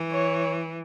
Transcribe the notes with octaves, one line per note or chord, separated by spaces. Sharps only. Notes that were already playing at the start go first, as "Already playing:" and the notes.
Already playing: E3
C#5